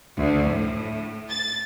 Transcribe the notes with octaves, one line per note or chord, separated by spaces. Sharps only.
D2
A2
A6